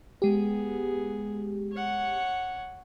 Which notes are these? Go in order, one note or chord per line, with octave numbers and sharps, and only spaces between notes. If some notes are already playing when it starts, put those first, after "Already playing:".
G#3 B3 G4 G#4
C#5 F#5